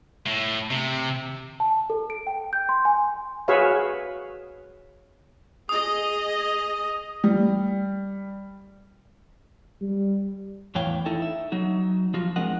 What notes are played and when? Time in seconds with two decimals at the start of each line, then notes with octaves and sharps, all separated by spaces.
0.26 A2
0.70 C3
1.60 A5
1.90 A4
2.10 D7
2.27 G5
2.53 G6
2.69 C6
2.85 G#5
3.48 F#4 G#4 B4 C#5 E5 F5
5.69 G#4 D#5 D#6
7.24 G3
9.81 G3
10.75 E2 A2 E3 C#5 F5 G5
11.06 D#4 E4 A4
11.22 E5
11.52 F#3 D#4 F#4
12.14 F3 F4 F#4
12.36 G#3 C4 D4 A#4 D#5 F#5